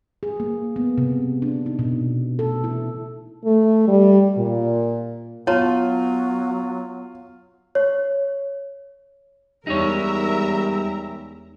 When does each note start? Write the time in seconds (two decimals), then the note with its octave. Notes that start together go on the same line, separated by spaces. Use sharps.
0.23 G#4
0.40 A#3
0.76 B3
0.98 C3
1.42 D4
1.66 D#4
1.79 B2
2.39 A4
2.64 E4
3.45 A3
3.88 G3
4.38 A#2
5.47 F#3 B3 F4 C#5 A5 A#5
7.75 C#5
9.67 E2 G3 G#3 D#4 A#4 C#5 E5 A#5